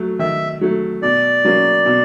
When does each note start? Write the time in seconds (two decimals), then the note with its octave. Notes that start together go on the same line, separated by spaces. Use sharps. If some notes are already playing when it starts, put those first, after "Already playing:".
Already playing: F#3 A3
0.19 D#3 E5
0.61 F#3 A3
1.02 B2 D5
1.44 F#3 A#3 C#4
1.86 B2